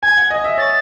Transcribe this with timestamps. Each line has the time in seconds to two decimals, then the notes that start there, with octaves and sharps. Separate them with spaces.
0.03 G#5 G#6
0.17 F#5
0.30 D#5
0.44 E5
0.58 C#5 A6